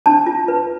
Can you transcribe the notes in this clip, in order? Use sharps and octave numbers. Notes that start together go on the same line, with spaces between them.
D4 A5
F4
B4